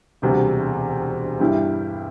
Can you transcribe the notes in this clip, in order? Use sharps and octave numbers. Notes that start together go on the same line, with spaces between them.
E1 D2 C3 G3
G2 G3 E4 G4